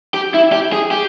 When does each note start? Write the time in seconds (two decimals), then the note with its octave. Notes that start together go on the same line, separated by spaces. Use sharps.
0.14 G4
0.34 E4
0.52 G4
0.72 G#4
0.91 G4